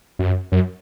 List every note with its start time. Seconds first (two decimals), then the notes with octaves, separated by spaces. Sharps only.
0.19 F#2
0.52 F#2